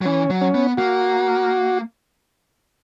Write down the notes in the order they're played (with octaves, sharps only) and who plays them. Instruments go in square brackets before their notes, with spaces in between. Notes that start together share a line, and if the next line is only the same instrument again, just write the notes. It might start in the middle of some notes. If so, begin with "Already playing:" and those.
[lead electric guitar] F#3
[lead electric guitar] E3 [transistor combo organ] C#4
[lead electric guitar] F#3
[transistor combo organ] C#4
[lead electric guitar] B3
[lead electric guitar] A#3 [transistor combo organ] F#4